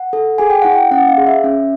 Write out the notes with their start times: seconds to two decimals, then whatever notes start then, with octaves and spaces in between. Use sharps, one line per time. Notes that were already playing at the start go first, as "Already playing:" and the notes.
Already playing: F#5
0.13 A4
0.38 G#4 G#5
0.50 G5
0.62 E4 F#5
0.73 G5
0.91 C#4 F#5
1.09 F5
1.18 G#4
1.27 E5
1.44 C#4